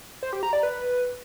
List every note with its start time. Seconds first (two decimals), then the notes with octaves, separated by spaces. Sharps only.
0.23 C5
0.33 G4
0.43 A#5
0.53 D5
0.63 B4